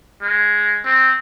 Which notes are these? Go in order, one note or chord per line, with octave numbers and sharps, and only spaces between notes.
G#3
C4